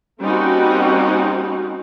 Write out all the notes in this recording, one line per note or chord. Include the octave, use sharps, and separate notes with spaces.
G3 A#3 C4 C#4 D#4 F#4